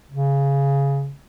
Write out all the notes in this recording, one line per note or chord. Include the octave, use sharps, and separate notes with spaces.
C#3